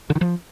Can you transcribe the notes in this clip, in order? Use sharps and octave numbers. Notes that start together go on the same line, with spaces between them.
D3
D#3
F3